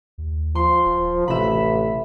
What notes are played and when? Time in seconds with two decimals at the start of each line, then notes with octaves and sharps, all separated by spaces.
0.18 D#2
0.55 F3 C6
0.85 D#1
1.28 A1 C3 E5 B5